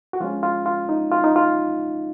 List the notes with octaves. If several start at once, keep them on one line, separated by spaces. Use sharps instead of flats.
F#4
F3 G#3 C#4 F4
F4
F4
D#4
F4
D#4
F4